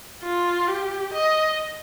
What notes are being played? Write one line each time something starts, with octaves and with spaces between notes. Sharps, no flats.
F4
G4
D#5